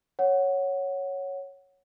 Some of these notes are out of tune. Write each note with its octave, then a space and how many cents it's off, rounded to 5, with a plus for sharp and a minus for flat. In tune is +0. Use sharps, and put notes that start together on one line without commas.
C#5 +0 F#5 +0